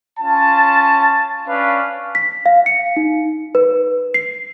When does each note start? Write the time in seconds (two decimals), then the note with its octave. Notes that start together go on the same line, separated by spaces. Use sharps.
0.20 C#4 F4 A5
1.48 C#4 D4 B4 F5
2.15 B6
2.46 F5
2.66 C#7
2.97 D#4
3.55 B4
4.14 C7